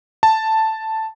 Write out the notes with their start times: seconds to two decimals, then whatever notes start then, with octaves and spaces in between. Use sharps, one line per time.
0.23 A5